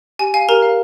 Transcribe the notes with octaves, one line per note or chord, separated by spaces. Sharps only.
G4 G#5
F5 G#5
G4 A#4 A#5
F5